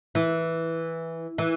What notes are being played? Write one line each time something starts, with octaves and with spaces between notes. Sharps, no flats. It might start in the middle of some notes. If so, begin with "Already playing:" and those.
E3
E3